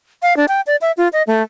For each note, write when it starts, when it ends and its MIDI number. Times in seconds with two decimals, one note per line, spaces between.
0.22 0.36 77
0.37 0.45 62
0.48 0.61 79
0.67 0.76 74
0.81 0.92 76
0.97 1.08 65
1.13 1.22 75
1.27 1.42 57